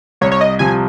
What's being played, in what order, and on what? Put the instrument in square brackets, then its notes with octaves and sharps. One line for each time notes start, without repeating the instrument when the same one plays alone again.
[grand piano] C2 [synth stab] C#5
[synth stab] C#5
D#5
[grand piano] C3 F3 [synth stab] G#5